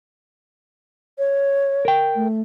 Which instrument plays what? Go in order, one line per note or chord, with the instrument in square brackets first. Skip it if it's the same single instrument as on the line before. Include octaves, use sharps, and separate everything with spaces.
[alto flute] C#5
[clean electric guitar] A#4 G5
[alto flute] A3